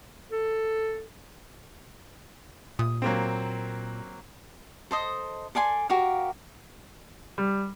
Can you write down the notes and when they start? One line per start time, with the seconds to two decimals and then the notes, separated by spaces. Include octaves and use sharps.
0.32 A4
2.79 A#2 D#6
3.02 F#3 A#3 C4
4.91 A4 C5 D#5 D#6
5.55 A4 D5 G#5 C6
5.89 F#4 G4 A#4 F5
7.38 G3